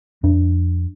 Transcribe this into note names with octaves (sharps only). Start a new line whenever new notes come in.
F2 D4